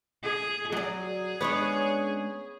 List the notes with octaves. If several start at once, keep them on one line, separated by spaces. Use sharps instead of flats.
G#4
F#3 G#4 D5
G#3 B3 C#4 D4 C#5